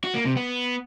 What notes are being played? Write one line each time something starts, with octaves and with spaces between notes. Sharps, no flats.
F#4
A#3
C3
B3